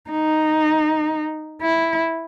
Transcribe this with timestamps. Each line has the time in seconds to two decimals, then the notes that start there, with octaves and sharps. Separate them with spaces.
0.11 D#4
1.62 E4